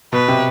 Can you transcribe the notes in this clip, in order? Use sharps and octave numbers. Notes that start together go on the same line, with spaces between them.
B2 B4
C3